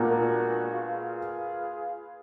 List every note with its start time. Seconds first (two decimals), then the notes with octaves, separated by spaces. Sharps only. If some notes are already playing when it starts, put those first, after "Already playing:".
Already playing: A#2 G#3 A#3 B3 D4 F#4
0.73 F4 G#4 B4 F5